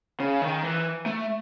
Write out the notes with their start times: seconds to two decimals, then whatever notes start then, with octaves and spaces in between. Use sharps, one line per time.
0.20 C#3
0.42 D#3
0.63 E3
1.06 A3